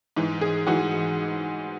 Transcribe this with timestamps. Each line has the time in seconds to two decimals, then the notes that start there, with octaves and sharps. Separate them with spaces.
0.16 G#2 E3
0.41 G#4
0.67 G#2 E3 F#4